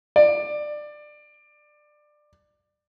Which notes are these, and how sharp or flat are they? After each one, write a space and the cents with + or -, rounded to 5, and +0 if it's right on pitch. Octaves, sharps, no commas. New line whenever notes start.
D5 +20